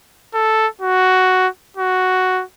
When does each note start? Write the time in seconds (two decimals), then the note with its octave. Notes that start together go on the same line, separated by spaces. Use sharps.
0.34 A4
0.81 F#4
1.77 F#4